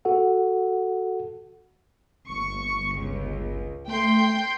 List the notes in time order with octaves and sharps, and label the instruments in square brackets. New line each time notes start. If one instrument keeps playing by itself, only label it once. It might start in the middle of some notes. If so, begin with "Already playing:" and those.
[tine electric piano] F#4 A4 F#5
[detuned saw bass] G1 [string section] C#6
[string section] C#2
[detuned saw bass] A3 [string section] G5 C6 G6